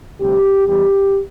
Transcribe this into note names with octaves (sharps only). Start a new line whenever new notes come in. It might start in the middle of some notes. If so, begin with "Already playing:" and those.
D2 C3 G3 G4
E2 E3 G3 G4